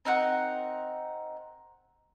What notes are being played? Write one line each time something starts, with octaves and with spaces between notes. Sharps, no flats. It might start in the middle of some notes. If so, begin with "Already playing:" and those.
C4 D#4 A#4 F#5